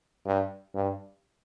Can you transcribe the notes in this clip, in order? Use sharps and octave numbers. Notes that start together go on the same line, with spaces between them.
G2
G2